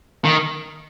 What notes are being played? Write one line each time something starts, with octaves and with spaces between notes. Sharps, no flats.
D#3